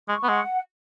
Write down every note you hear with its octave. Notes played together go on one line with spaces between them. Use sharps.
G#3 C#6
B3
G#3 F#5